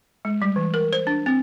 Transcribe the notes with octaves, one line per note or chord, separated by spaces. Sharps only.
G#3
G3
E3
A#4
C5
D4
C4